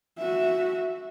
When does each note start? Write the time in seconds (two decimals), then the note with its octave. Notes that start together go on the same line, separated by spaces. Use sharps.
0.19 F#4 E5